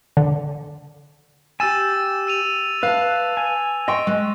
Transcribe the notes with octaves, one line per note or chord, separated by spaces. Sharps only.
D3
G4 G#5 E6 A6 E7
E6 D#7 F7
B4 F5 A5
G#5
D#5 G5 C6 C#6
G#3